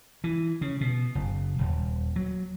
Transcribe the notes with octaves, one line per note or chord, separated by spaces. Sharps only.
E3
C#3
B2
F#1
D#1
F#3